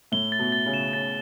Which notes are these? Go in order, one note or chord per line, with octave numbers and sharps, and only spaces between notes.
A2 G7
A6
B2
A6
C#3
E7
C#3 A6